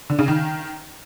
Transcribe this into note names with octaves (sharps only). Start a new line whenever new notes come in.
D3
C#3
D#3